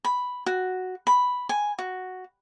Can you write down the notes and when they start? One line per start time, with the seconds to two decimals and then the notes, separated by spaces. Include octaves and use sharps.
0.05 B5
0.46 F#4
1.07 B5
1.49 G#5
1.79 F#4